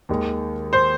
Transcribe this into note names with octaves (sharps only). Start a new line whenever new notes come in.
D#2 D#3 G#3
C5